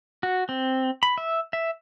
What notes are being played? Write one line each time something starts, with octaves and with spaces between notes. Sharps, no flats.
F#4
C4
B5
E5
E5